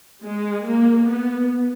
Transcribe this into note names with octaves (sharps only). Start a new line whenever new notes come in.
G#3
A#3
B3